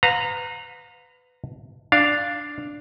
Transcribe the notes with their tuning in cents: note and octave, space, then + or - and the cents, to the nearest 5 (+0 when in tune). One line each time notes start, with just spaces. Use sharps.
B4 +20 F5 +40 A#5 -10
D4 +0 F5 +0